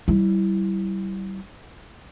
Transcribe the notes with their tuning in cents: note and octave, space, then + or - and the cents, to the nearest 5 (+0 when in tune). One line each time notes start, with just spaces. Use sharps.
G3 -25 E4 +0